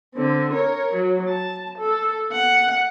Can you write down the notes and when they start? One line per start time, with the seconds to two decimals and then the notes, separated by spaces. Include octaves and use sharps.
0.14 D3 C4
0.53 A#4 C#5
0.94 F#3
1.28 A5
1.78 A4
2.32 F#5